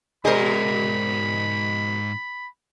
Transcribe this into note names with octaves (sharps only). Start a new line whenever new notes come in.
G#2 B2 G#4 A#4 C5 D5 D#5 B5